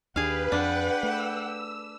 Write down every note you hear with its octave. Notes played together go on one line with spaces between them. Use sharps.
D#2 D4 G4 G#4 B4 F5
F2 D4 F#5 G5
A3 E6